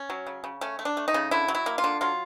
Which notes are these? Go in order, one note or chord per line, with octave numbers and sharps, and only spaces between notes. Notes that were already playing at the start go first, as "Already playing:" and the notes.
Already playing: C#4
F#3
C#3
C#3
A3 C#4
A3
D4
A3
D#4
C#3
D3 E4
F#3
E4
A#3
F4
D3
F#3 F4